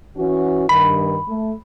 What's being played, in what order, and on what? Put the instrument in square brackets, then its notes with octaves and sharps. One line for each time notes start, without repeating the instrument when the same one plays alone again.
[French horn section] E3 C#4 F#4
[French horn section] G2 D#3 [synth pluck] B5
[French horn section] A3